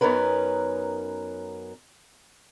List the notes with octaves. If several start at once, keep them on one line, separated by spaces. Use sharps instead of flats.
F#2 B3 C#4 D#4 A#4 B4